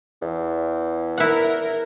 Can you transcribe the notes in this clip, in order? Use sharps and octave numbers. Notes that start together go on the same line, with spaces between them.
E2
E4 A#4 F#5